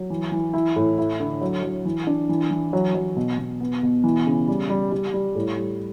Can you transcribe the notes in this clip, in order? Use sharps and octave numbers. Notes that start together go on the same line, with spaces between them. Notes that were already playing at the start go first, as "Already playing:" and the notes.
Already playing: F#3
E3
E3
E4
A2
E4
D3
F#3
F#3
E3
D4
E3
E3
F#3
F#3
B2
B2
B3
B2
E3
C#3
G3
G3
G3
G3
A2
G3